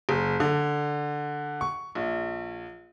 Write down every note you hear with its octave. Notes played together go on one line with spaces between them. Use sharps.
F#1
D3
C#6
A#1